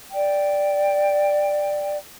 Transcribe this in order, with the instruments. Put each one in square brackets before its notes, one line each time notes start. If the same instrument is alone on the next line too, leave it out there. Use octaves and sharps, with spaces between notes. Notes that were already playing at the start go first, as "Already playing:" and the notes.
[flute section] D5 G5